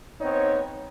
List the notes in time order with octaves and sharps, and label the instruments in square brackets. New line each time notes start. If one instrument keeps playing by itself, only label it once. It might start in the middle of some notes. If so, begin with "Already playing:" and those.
[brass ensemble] B3 C4 D#4 C#5